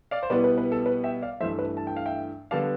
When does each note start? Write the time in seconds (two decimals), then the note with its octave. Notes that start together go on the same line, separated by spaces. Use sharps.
0.11 D5 F5
0.23 C5
0.30 B2 G3 B3 E4 B4 D5
0.44 B4
0.58 B4
0.72 A4
0.86 B4
1.04 E5 G5
1.22 D5 F5
1.40 G2 E3 A3 C5 E5
1.59 B4
1.77 A5
1.87 G5
1.96 F5
2.06 E5 G5
2.51 D3 G3 B3 D4 F5 A5